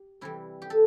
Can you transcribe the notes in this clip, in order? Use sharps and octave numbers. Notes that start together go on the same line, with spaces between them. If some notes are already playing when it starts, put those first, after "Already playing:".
Already playing: G4
C3 E3 G3 E4
G4
A4